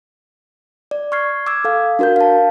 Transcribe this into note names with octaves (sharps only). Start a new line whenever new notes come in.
D5
C#6 F6 G#6 C7
D6 E6 G#6
A4 F5
D4 F#4 A#4 F5 G6
F5 A5